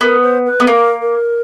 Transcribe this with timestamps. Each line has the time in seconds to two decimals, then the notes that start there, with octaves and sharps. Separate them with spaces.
0.01 B3 A#4
0.22 C5
0.46 B4
0.60 B3
0.67 A#3 A#4
1.01 A#4